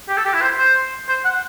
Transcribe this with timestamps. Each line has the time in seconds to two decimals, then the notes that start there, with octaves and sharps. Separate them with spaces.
0.09 G4
0.17 A4
0.25 G4
0.33 E4
0.42 C5
0.58 C5
1.08 C5
1.25 F#5